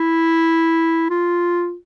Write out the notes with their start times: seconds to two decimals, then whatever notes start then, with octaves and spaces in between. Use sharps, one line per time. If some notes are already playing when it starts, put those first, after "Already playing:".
Already playing: E4
1.10 F4